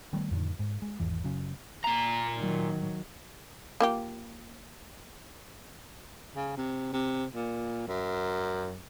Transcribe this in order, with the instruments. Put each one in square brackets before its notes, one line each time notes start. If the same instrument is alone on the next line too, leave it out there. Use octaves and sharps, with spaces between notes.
[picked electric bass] D#3 G3 A3 B3
F2 A2 D3 D#3
G#2
G#3
G#1 E2 E3
F#1 C#3 F#3
[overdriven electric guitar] A#2 A#5
[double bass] D#3 F#3
[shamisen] A#3 F4 G4
[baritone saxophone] C#3
C3
C3
A#2
F#2